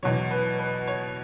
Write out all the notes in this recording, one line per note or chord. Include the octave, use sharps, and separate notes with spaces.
E2 B2 F#3 C#5
B4
B4
C#5